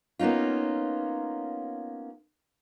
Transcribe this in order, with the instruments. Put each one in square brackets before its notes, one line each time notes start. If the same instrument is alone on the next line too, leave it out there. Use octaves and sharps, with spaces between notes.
[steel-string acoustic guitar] A#3 B3 C#4 D#4 F4